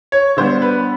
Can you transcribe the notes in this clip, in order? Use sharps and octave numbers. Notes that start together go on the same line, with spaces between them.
C#5
D3 G3 B3 C5
B4